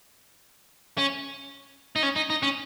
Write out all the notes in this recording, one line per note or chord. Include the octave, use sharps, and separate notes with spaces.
C#4
D#4
C#4
D#4
D#4
C#4